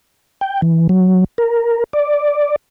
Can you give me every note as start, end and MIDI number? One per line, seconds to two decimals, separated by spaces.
0.41 0.61 79
0.62 0.87 52
0.89 1.24 54
1.38 1.84 70
1.93 2.56 74